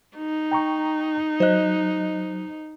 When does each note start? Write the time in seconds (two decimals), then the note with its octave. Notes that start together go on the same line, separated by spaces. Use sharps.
0.17 D#4
0.51 G5 A#5 C#6
1.40 F#3 C5 D#5 F#6